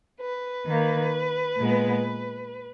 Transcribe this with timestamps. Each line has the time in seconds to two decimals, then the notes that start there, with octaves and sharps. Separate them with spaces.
0.21 B4
0.66 D#3 A#3
1.58 A#2 G#3 B3